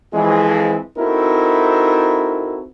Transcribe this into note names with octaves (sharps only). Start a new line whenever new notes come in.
F2 E3 G#3
C4 D#4 E4 F#4 A4 A#4